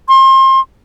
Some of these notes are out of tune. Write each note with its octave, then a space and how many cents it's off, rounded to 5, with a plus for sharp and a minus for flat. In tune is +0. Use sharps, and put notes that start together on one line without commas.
C6 +30